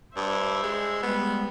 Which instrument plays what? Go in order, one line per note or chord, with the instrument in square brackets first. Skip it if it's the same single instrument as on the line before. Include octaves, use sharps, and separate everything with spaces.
[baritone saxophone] G2 [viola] C5 E5
[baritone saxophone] G#3
[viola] G3 G#3 [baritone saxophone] B3